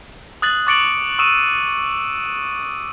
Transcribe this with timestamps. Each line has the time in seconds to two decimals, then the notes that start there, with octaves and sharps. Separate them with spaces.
0.42 D#6 F#6 A6 F#7
0.67 C#6 D6 A6 C#7 D7 F#7
1.19 C#6 D#6 E6 D#7 E7 F#7